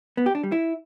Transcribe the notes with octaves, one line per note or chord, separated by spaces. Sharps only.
B3
G4
D4
G3
E4